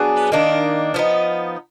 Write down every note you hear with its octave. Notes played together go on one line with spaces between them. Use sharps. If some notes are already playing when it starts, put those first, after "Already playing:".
Already playing: F#3 B3 D4 G#4
D#3 A#3 D4
F3 B3 D#4